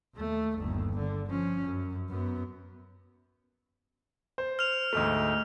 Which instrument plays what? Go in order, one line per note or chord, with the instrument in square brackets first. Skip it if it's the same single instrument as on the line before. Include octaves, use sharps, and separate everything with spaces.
[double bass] D#2 A3
G1 D#2
D3
F3 C#4
F#2
F#2 B3
[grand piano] C5
[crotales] F6 F7
[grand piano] D2 G#2 A3